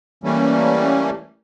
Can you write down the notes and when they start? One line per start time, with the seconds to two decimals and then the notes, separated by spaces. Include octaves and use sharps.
0.24 E3 G3 A3 A#3 C#4